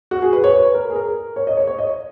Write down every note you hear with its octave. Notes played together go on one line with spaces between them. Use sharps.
F#4
G#4
B4
C#5
B4
A#4
G#4
A#4
C#5
D#5
C#5
C#5
D#5